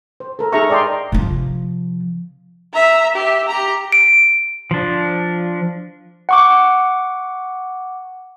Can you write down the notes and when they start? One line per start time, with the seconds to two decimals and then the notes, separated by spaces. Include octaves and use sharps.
0.20 C5
0.39 A4 A#4
0.52 D#4 G#4 A4 E5 A#5 C#6
0.70 D5 D#5 G5 A#5 C6
1.12 C3 F3
2.73 E5 A#5
3.15 G4 E5
3.48 G4 A#5
3.92 D7
4.71 F3 D4
6.29 F#5 C#6 D6